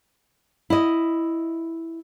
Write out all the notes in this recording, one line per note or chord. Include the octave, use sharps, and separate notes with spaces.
E4 D#5